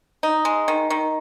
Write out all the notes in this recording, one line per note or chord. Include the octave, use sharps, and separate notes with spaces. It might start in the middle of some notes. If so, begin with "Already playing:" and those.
D#4
G#3
D#3
D#3